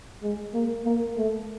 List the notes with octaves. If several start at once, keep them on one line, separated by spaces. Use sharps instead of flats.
G#3
A#3
A#3
A3